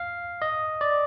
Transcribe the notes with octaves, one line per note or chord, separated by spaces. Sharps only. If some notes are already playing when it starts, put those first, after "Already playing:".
Already playing: F5
D#5
D5